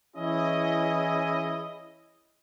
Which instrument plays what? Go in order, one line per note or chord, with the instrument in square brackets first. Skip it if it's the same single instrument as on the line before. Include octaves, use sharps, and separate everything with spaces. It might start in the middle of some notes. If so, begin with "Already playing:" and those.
[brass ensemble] E3 C#4 E4 G#4 D#5